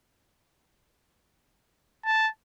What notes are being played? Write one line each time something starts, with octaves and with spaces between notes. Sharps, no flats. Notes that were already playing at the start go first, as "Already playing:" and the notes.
A5